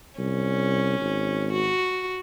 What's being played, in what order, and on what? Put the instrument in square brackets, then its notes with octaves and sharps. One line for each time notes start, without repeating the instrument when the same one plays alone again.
[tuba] C2 [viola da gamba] C#4
[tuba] G#1
[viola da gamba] F#4